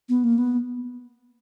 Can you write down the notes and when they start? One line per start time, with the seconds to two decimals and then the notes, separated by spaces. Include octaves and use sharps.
0.09 B3
0.24 A#3
0.38 B3